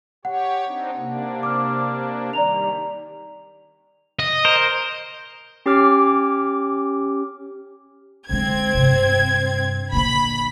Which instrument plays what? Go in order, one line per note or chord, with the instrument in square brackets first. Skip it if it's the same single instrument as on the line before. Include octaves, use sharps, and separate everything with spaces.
[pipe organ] G4 C#5 [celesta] F#5
[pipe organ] C4 D4 D#4
C3 A#3 D4
[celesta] D6 F6
[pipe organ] D#3 G3 [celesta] D5 A#5 F7
[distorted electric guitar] D#5
[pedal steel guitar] A#4 C5
[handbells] C#4 G4 C#5 D6 F6
[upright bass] D3 G#3 [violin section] C4 G#6
[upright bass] G2 C3
[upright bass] A#2 D3 [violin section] B5